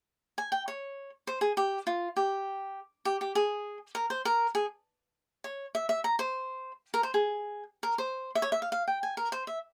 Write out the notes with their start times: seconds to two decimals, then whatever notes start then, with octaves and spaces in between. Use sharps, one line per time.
0.38 G#5
0.52 G5
0.68 C#5
1.27 C5
1.41 G#4
1.57 G4
1.87 F4
2.16 G4
3.05 G4
3.21 G4
3.35 G#4
3.95 A#4
4.10 C5
4.25 A#4
4.55 G#4
5.44 C#5
5.75 E5
5.89 E5
6.04 A#5
6.19 C5
6.94 A#4
7.03 C5
7.14 G#4
7.83 A#4
7.98 C5
8.35 E5
8.42 C#5
8.52 E5
8.62 F5
8.72 F5
8.88 G5
9.03 G#5
9.17 A#4
9.32 C5
9.47 E5